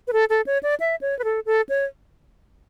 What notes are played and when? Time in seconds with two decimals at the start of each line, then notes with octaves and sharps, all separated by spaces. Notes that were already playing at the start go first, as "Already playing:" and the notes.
0.08 B4
0.13 A4
0.30 A4
0.47 C#5
0.63 D5
0.80 E5
1.01 C#5
1.19 B4
1.24 A4
1.46 A4
1.69 C#5